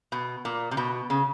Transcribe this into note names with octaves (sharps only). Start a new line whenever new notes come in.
B2
A#2
C3
B2
C#3